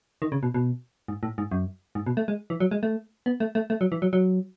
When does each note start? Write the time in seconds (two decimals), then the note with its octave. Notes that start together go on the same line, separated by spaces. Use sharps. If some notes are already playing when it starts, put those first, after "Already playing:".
0.22 D#3
0.32 C#3
0.43 B2
0.54 B2
1.08 G#2
1.23 A2
1.38 G#2
1.52 F#2
1.95 G#2
2.07 B2
2.17 A3
2.28 G#3
2.50 E3
2.60 F#3
2.71 G#3
2.83 A3
3.26 B3
3.40 A3
3.55 A3
3.70 A3
3.81 F#3
3.92 E3
4.02 F#3
4.13 F#3